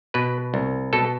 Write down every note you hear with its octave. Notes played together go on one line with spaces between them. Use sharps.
B2 B4
C2
B2 A4